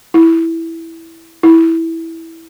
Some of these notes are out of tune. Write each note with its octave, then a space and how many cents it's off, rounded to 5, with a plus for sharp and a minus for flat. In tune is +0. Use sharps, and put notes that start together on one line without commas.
E4 +0
E4 -5